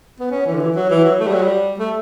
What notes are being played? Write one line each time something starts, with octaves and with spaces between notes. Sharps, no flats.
B3
C#4
E3
D3
E3
F#3
E3
F#3
A3
G3
F#3
G3
A3